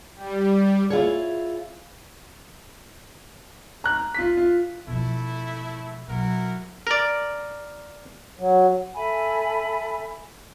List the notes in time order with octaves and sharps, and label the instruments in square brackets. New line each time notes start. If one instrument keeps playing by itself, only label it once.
[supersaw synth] G3
[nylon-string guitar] E4 F4 G#4 C#5
[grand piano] A#5 F#6
F4 B6
F4
[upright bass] B2 F3 [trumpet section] A3 E4
[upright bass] B2 F#3 [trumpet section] E4 F#4 A#4
[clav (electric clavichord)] A#4 D5
[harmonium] F#3
[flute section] A4 E5 G#5 B5